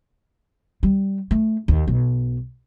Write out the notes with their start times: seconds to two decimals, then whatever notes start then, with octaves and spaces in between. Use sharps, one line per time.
0.83 G3
1.31 A3
1.68 D#2
1.88 B1